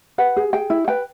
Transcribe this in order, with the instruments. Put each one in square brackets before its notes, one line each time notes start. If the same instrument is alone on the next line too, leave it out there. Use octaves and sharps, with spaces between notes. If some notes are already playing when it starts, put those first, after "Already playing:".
[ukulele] B4 F#5
G#4
G#4 G5
E4
B4 G5